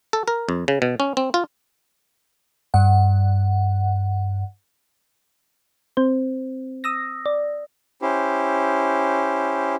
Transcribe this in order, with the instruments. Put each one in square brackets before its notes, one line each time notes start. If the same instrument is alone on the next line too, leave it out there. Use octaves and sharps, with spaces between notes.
[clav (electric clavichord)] A4
A#4
F2
C#3
B2
C#4
C4
F4
[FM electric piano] G2 F#5
[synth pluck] C4 C5
D#6 E6 A#6
D5
[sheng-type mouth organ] C#4 E4 G4 C5